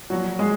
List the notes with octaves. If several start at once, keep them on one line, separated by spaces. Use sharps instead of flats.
A#2 F3 F#3 F#4
G#3 G#4